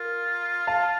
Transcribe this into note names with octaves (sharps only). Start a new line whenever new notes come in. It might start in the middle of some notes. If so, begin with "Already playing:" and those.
Already playing: F4 A#4
F5 A5